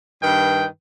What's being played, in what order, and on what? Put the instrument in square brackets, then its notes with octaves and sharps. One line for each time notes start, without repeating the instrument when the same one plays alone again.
[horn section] G2 D#3 B4 G5